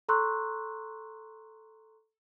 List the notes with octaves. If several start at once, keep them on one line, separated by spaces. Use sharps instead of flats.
A4 A#5 C6 C#6 E6 F#6